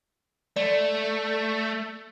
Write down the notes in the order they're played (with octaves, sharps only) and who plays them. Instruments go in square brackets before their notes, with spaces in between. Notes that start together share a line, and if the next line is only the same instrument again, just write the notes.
[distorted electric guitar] A3 [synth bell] D5